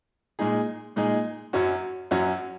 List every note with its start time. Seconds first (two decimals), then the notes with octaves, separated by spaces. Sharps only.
0.39 A#2 G#3 D#4 G#4
0.96 A#2 G#3 D#4 G#4
1.53 F#2 F#3 C#4 F#4
2.11 F#2 F#3 C#4 F#4